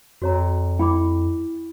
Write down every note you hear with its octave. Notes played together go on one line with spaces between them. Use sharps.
F2 F#4 C#5 A#5
E4 G5 B5 D6